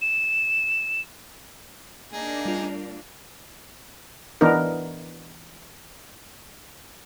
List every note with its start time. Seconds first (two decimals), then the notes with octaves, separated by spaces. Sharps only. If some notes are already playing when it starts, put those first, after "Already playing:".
0.02 E7
2.13 A#3 D4 D#4 G#4
2.45 G3 F4
4.41 E3 B3 D4 D#4 A#4